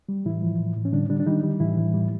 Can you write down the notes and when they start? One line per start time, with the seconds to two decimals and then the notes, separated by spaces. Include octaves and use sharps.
0.09 G3
0.25 A2 E3 E4
0.42 F3
0.60 A2
0.76 A2
0.85 C#4
0.93 D3 G3 D4
1.09 D3 G3 D4
1.20 D4
1.26 D#3 G3 D#4
1.43 G3
1.60 A2 E3 E4
1.77 A2
1.94 G3